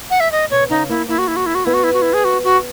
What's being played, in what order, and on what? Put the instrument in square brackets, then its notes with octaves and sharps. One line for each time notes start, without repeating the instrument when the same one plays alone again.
[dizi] F#5
E5
D#5
[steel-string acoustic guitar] B2 [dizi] C#5
[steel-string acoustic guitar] C#3 [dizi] D#4
[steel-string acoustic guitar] A#3 [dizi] E4
[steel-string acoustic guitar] A#3 [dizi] E4
[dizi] F#4
E4
F#4
E4
F#4
[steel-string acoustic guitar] B3 [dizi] E4
[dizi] F#4
E4
F#4
E4
G#4
F#4
F#4